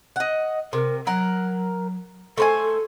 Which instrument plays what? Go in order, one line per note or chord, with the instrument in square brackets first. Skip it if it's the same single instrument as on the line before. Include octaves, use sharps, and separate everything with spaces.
[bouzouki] D#5 F#5
[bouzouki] C3 [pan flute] A#4
[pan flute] F#3 [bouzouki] A#4 F#5
[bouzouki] A3 C5 G#5 [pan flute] A4